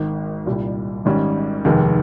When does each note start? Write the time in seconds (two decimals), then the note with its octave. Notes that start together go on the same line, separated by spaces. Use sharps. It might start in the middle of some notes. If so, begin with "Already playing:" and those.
Already playing: G#1 G#2 D#3
0.46 C2 A#2 G3
1.05 G#1 G#2 G3 C#4
1.65 F1 D#2 D#3 G#3